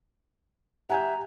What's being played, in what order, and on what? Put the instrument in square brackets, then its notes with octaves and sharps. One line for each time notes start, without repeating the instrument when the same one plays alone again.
[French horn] G4 [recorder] E5 [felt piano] F#5 G#5 G6 [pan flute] A#5